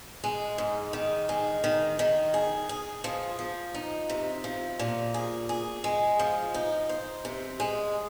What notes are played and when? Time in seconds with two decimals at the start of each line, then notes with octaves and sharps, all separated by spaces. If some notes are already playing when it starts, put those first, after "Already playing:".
0.24 G#3
0.58 G#2
0.93 D#3
1.29 G#3
1.64 D#3
1.99 D#3
2.34 G#4
2.69 G#4
3.04 F3
3.39 F3
3.74 D#4
4.09 C3
4.44 F3
4.79 A#2
5.14 G#4
5.49 G#4
5.84 G#3
6.19 F3
6.54 D#4
6.89 C5
7.25 C3
7.60 G#3